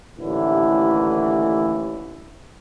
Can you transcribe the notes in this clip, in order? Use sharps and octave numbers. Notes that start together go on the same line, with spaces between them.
A1 D#2 A2 D3 E3 E4